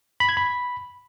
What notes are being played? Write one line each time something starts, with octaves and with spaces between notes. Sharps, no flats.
B5
G#6
B5